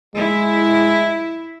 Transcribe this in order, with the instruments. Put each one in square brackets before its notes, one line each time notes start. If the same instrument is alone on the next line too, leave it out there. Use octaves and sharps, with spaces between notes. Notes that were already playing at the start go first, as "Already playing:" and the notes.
[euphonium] G#3 [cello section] E4